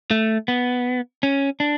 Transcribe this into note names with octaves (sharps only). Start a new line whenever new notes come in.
A3
B3
C#4
D4